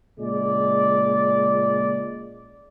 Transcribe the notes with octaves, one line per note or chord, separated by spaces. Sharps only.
A#2 C#3 G#3 D5